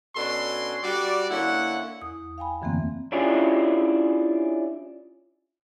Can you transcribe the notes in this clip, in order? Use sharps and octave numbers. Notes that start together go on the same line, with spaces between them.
B2 C#4 D4 A4 C#5 C6
G3 F#4 D5
D3 A#3 C#4 E4 F#5
E2 D#6
F5 G5 G#5 B5
F#2 D3 E3 A3 A#3 C4
C#4 D4 E4 F4 G4 G#4